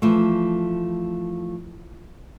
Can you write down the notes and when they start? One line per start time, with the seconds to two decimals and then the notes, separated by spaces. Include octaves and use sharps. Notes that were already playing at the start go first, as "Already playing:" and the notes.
0.02 E3 F3 A3